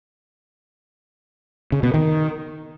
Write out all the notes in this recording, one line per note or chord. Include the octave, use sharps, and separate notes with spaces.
C#3
B2
D#3